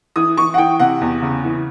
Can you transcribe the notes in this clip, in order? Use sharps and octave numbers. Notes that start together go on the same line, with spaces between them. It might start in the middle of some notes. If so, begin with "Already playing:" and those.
E3 D#6
E3 C#6
F#5
E3 G5
C3 F#5
E2
C#3
E3